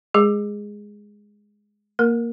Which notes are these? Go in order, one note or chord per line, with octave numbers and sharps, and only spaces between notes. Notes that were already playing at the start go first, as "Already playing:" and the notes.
G#3 G#4
A#3 A#4